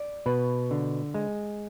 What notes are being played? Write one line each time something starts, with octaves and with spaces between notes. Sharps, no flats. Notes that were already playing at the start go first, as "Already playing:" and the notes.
Already playing: D5
B2 B4
D3
G#3